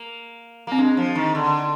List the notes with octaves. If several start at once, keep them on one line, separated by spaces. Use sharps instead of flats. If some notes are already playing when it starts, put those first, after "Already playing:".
Already playing: A#3
A#3 C4
G#3 D4
F3
D#3
D3